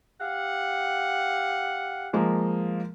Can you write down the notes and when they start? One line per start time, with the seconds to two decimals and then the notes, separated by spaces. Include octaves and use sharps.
0.21 G4 F5 F#5
2.13 F3 G#3 A#3